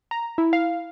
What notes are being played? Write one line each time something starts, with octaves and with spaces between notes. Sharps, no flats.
A#5
E4
F5